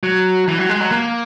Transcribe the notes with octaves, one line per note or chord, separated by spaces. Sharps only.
F#3
E3
F#3
G#3
F#3
A#3